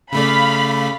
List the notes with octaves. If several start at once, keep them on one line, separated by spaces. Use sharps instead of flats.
C#3 A3 D5 F5 B5